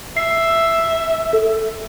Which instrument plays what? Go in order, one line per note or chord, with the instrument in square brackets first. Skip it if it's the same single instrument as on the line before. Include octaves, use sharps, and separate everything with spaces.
[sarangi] E5 [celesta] C7
[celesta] A4